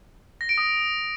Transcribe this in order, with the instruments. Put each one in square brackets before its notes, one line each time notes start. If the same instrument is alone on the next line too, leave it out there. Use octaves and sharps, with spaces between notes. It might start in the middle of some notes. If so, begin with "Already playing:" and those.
[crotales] A#6
D7
D#6